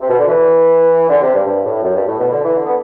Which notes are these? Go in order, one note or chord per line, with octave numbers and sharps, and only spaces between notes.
C3
B2
D3
E3
D3
C3
G2
G2
A2
F#2
G2
A2
B2
D3
E3
D3
B3